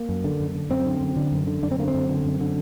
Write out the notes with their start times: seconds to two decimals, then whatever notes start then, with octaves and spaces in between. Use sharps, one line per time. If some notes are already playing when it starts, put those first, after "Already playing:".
Already playing: A#3
0.09 F#2
0.24 D3
0.40 F#2
0.55 D3
0.70 F#2 C4
0.86 D3
1.01 F#2
1.16 D3
1.32 F#2
1.47 D3
1.62 F#2 D4
1.71 C4
1.79 D3 A#3
1.88 C4
1.94 F#2
2.09 D3
2.25 F#2
2.41 D3